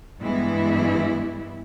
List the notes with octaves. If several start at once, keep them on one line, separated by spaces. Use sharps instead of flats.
G2 E3 G#3 B3 E4